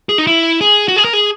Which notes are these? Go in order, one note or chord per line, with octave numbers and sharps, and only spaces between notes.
G#4
D#4
E4
G#4
F#4
G#4
A#4
G#4